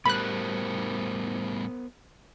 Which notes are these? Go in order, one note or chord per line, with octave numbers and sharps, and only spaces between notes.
A2 G3 B3 A#4 C5 B5 F#6